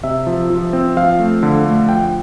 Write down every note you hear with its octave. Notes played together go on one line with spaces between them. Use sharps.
C3 E5
F3
F3
C4
F3 F5
A3
D3
A3
F3 G5